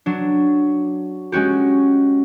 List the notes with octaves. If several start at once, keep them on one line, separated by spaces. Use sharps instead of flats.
F#3 D4
G#3 C#4 F#4 G4